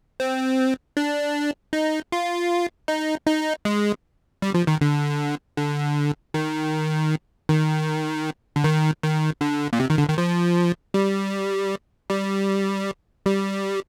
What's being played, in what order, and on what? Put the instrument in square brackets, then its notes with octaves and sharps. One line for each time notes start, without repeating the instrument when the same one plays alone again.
[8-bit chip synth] C4
D4
D#4
F4
D#4
D#4
G#3
G3
F3
D#3
D3
D3
D#3
D#3
D3
D#3
D#3
D3
A#2
C3
D#3
D3
D#3
F3
G3
G3
G3